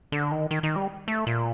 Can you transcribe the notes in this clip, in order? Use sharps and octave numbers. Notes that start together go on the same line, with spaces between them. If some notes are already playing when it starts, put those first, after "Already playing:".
D3
D#3
D#3
D#3
G3
A3
A#2